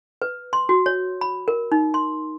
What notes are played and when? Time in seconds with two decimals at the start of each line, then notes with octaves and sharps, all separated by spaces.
0.22 B4
0.53 C6
0.69 F#4
0.86 C#5
1.21 B5
1.48 A#4
1.72 D#4
1.94 C6